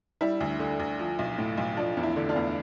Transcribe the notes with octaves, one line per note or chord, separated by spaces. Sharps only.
G3 E4
D2
D3
D2
F3
B1
A2
B1
F3 D4
E2
E4
D3
D4 F4
E2